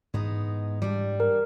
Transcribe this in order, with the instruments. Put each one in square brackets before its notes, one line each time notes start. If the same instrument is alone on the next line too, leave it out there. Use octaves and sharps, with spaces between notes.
[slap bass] G#2 E3 [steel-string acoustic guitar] G#3 B3 D#4
[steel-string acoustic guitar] G3 D4
[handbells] A#4